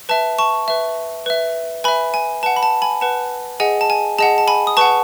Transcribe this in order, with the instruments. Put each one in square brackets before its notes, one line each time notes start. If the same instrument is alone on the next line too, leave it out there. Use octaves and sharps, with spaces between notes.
[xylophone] B4 E5 A5
A5 C#6
B4 E5
B4 E5
B4 E5 G#5 B5
G#5
B4 F#5 A5
B5
A5
G#5 B5
B4 F#5 A5
G#4 D#5 F#5 G#5
A5
G#5
G#4 D#5 F#5 A5
A5
G#5 B5
D#6
B4 F#5 A5 C#6